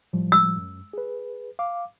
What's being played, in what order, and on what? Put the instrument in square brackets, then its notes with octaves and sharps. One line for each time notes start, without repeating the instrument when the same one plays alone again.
[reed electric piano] A2 F3 G3
[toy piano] E6
[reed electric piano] F#2
G#4 B4
F5 D6